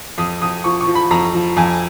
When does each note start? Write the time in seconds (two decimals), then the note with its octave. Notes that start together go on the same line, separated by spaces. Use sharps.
0.18 F2 D#6
0.41 F2 D#6
0.64 F3 C#6
0.81 C#6
0.87 F3
0.95 B5
1.11 F2 A#5
1.34 F3
1.57 F2 G#5